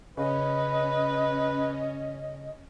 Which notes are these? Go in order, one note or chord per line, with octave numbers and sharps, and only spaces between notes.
C#3 C#4 B4 D#5